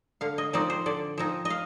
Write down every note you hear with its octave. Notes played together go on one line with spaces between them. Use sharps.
D3 F5
D#5
F3 C4 D#4 D5
C5
D3 D5
F3 C4 D#4
D#5
F5